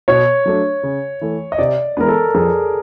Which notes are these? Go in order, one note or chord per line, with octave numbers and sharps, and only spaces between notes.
B2 C#5
F#3 A3 D4
C#3
E3 A3
D#5
C3 D5
E3 G#3 B3 A#4
A4
F2 G#4